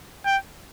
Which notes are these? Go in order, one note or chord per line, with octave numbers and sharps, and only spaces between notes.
G5